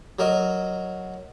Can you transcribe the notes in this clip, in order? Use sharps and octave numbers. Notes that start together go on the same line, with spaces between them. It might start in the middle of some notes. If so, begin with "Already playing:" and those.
F#3 A#4 D#5